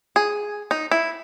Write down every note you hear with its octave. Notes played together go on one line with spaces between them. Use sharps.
G#4
D#4
E4